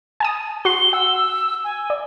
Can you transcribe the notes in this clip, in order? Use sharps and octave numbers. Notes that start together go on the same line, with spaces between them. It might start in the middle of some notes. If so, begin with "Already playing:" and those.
G#5 A5 D#6
F#4 C6 G7
F#5 E6
G#5
D5